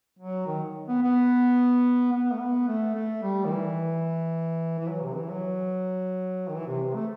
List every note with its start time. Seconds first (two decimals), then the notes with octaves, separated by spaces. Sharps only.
0.19 F#3
0.47 D#3
0.88 B3
1.02 B3
2.12 B3
2.32 A3
2.40 B3
2.68 A3
2.95 A3
3.23 G3
3.45 D#3
3.50 E3
4.79 E3
4.88 F#3
5.02 C3
5.16 E3
5.30 F#3
6.48 D#3
6.54 E3
6.67 C3
6.81 C3
6.95 A3